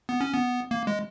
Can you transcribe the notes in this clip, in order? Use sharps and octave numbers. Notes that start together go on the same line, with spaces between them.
B3
C#4
B3
A#3
G#3